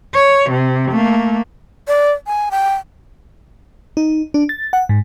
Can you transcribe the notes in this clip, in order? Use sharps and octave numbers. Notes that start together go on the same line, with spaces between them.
C#5
C3
A3 A#3
D5
G#5
G5
D#4
D4
A6
F#5
G#2